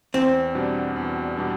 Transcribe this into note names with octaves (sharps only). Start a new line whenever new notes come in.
E2 C4
B2 G3 D4
E2
B2 G3 D4